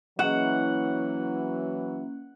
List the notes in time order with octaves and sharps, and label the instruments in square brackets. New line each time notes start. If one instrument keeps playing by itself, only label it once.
[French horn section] E3 F#3 E4 [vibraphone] A#3 C#4 [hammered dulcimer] F#5